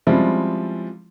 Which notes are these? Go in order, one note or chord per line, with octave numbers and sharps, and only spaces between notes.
F3 G3 G#3 C4 C#4 E4